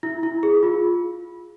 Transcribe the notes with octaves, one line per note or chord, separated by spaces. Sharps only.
E4
E4
G#4
F4